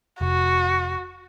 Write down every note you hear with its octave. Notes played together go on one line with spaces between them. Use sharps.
F1 F#4